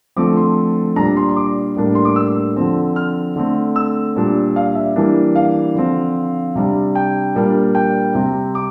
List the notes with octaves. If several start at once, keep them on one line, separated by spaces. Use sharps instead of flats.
D3 F3 A3 C4 D6
C6
A#2 G3 D4 A#5
C6
C6
D6
A2 G3 A#3 D4
C6
D6
E6
D3 F3 C4
F6
D3 A3 C4
E6
A#2 G3 D4
F5
E5
E3 G3 A#3 D4
F5
D3 F3 C4
C3 G3 D4
G5
A#2 G3 A#3 D4
G5
C3 G3 C4
D6